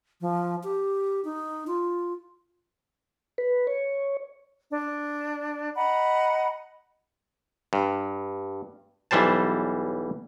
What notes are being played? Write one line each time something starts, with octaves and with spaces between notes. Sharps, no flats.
F3
G4
D#4
F4
B4
C#5
D4
D#5 F#5 A#5 B5
G2
B1 E3 G3 C5 A5